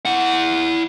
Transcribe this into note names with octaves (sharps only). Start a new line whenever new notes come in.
E4 F#5